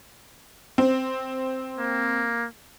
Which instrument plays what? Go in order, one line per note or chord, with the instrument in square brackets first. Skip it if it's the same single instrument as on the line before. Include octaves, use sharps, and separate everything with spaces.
[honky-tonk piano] C4
[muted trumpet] A#3